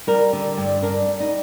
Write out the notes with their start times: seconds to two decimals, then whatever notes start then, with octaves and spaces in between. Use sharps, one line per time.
0.07 G3 A#4
0.33 D3
0.57 G2
0.82 D4 A#4
1.08 G3
1.20 D#4